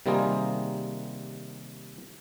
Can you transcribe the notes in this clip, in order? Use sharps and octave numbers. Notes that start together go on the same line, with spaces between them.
C3 D#3 G3 A#3 F4 G#4